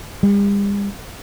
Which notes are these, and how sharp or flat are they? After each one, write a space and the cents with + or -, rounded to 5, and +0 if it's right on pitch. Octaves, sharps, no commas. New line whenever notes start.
G3 +45